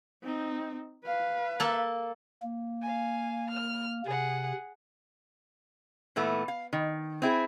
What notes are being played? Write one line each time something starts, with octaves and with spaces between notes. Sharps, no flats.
C4 D#4
B4 F5
A#3 A4
A#3
F5 G#5
F6
C3 G#4 F#5
A#2 E3 A3 B3
F5
D#3
C4 E4 G#4